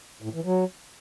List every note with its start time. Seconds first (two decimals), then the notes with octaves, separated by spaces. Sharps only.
0.22 A2
0.33 E3
0.44 F#3